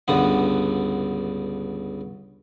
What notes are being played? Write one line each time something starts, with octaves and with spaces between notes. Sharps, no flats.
C#2 G2 D3 B3 F#5